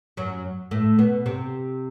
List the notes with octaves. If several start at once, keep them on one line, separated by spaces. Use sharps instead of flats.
F#2 F#3
A2 A3
B2 B3
C3 C4